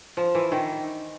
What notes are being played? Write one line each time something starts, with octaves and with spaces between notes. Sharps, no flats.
F3
E3
D#3